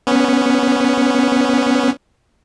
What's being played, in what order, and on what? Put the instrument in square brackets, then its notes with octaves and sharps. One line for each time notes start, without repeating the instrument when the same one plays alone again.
[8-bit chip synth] B3 C#4